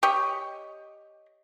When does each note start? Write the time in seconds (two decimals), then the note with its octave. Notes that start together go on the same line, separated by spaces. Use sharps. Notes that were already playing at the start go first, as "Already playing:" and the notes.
0.03 G4 C#5 D#5